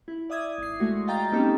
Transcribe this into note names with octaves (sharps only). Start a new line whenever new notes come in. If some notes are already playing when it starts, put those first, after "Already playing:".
E4
D5 E5 D#6 G#6
G#1 C7
G#3 A3 F#4
F4 D#5 F5 G5 A#5 A6
A#3 C4 C#4 D#4 G4 A4